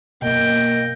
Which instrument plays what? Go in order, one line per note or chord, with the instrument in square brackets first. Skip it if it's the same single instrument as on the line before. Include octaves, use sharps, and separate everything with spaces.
[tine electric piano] F#2 B2 [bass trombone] A#3 [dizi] D#5 [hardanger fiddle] G5